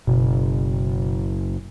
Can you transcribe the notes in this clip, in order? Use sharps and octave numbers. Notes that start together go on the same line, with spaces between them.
F#1 B2